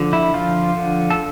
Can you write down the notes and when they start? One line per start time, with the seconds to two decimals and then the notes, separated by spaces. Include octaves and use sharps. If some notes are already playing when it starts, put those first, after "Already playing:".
Already playing: D3 F3
0.13 E4
0.34 F3 F4
0.76 D3
1.10 A4